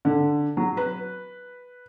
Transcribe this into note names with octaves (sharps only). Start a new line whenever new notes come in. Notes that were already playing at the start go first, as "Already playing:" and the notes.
D3
F#3
B4